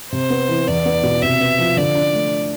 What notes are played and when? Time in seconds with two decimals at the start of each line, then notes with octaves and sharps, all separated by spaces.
0.12 C3 C5
0.30 B3
0.49 E3
0.67 E2 D5
0.86 B3
1.03 B2
1.22 C3 E5
1.40 B3
1.58 F3
1.77 D3 D5
1.95 D4
2.14 A3